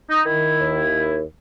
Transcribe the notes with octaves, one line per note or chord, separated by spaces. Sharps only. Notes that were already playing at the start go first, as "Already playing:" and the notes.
D#4
D#3 E4
D#2